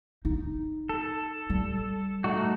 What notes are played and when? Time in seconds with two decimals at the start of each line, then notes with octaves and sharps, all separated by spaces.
0.25 D#4
0.89 A4
1.50 G3
2.24 A3 D#4 F#4